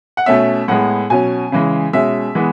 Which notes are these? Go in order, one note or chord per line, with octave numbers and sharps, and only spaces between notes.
F#5
B2 A3 C#4 E5
A2 G#3 B3 F#5
B2 F#3 C#4 G#5
C#3 E3 G#3
B2 G#3 C#4 E5
E3 G#3 B3